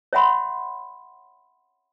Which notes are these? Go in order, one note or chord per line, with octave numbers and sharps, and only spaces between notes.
C#5 E5 F#5 B5 C6